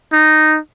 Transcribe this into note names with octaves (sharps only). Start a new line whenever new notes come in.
D#4